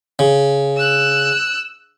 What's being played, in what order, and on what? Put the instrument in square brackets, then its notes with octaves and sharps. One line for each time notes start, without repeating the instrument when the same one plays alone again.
[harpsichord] C#3
[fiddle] E6 F#6